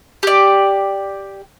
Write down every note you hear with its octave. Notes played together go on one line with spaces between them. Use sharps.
G4 D5